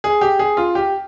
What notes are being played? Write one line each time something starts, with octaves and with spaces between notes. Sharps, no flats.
G#4
G4
G#4
F4
G4